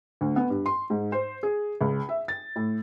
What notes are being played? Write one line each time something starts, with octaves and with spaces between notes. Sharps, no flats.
D2
B3
G2
C6
G#2
C5
G#4
C#2
E5
A6
A2